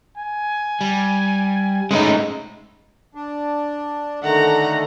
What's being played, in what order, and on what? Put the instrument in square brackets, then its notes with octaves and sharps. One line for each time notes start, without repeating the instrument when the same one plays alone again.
[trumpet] G#5
[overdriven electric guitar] G3
[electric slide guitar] G#3 A3 D#4 [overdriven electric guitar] C#4 B4
[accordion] D4
[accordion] D3 D#3 A3 [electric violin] F#5 A#5